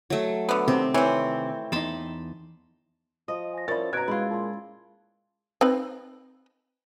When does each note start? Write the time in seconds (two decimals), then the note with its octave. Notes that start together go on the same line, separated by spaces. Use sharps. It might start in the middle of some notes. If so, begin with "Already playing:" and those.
0.10 F#3 A3
0.49 D3 B3
0.68 C3 D#3 C4 G4
0.94 E3 C4 C#5
1.72 E2 D#4 A5 B5 C6
3.28 F3 D#5 D#6
3.53 G#5 A#6
3.68 F3 C#4 E4 A#4 D5 E5 A6
3.93 B2 A#5 F#6 G#6 D7
4.08 G#3 E4 F4
4.31 A#2 A5 C6
5.61 C4 D#4 B4